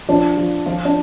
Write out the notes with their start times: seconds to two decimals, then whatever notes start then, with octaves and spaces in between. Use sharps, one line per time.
0.09 F3 D4
0.37 F3
0.66 F3 F4
0.85 D4